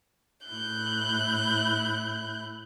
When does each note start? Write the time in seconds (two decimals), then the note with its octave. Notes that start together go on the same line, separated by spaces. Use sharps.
0.45 A2 E4 F#6 G6